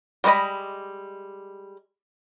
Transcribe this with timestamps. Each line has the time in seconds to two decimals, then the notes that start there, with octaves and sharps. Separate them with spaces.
0.24 G3 G#3 A#4 D#5 B5